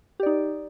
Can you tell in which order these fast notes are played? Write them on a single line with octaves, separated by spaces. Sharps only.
G4 D5 D#4